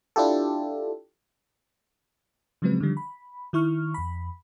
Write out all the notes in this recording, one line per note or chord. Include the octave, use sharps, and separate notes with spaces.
D4 E4 F4 G4 A4
C#3 F3 F#3 G#3 C4 B4
D3 D#3 F3 G3
B5
D#3 E4 C#6 F6
F2 B5